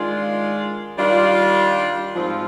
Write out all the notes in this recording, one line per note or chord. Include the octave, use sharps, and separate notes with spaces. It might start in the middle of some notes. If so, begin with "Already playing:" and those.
Already playing: D#3 G#3 D4 F4
D#3 G3 D4 F4
G#2 F3 C4 F4